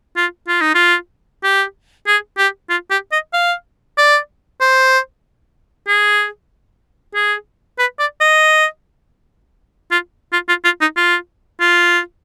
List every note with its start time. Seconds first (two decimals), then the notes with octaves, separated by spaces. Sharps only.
0.16 F4
0.48 F4
0.61 D#4
0.75 F4
1.43 G4
2.07 G#4
2.38 G4
2.69 F4
2.91 G4
3.12 D#5
3.33 F5
3.98 D5
4.61 C5
5.88 G#4
7.15 G#4
7.79 B4
7.99 D5
8.21 D#5
9.91 F4
10.33 F4
10.49 F4
10.64 F4
10.81 D#4
10.96 F4
11.61 F4